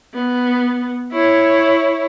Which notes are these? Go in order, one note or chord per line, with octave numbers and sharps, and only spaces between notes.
B3
E4 C#5